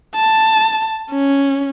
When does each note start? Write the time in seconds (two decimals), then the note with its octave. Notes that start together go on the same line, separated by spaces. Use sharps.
0.15 A5
1.11 C#4